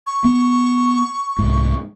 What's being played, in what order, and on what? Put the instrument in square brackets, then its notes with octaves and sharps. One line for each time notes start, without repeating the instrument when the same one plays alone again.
[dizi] C#6
[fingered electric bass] B3
C2 G#2